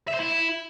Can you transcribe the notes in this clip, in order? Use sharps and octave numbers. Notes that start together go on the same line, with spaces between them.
E5
C5
E4